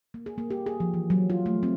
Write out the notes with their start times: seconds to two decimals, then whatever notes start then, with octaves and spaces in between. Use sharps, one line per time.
0.14 A#3
0.26 G#4
0.38 A#3
0.50 G4
0.66 G#4
0.80 F3
0.94 E3
1.10 F#3
1.30 F4
1.46 A3
1.63 C4